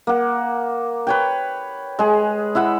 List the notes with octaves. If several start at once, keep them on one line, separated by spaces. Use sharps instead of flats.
A#3 F#5
B4 C#5 G5
G#3 G#4
E4 E5 F#5 B5